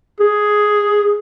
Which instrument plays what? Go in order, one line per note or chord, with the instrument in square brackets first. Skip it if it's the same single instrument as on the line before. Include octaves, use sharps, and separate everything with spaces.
[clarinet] G#4